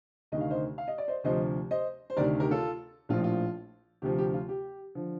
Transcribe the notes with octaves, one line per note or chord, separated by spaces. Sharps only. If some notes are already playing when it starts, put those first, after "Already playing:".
D2 C3 D#3 D#5
F5
C5 D#5
F5
D#5
D5
C5 D#5
D2 C3 F3 C5 D#5
C5 D#5
C5
D2 C3 D#3 A#4 D5
G4 A#4
F4 A4
A#1 A2 F3 F4
F4
D2 C3 F3 G4
G4
F4
G4
D3 F3